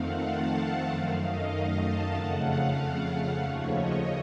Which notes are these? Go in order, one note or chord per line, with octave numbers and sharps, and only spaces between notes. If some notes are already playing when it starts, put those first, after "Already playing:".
Already playing: F2 D#3 A3 C4 F5 F#5
A5
A5
F#2 D#3 A3 F5
D#5
F5
A5
F2 C#3 A3 F#5
F5
F#5
F5
D#2 C#3 F3 A3 C#5
D#5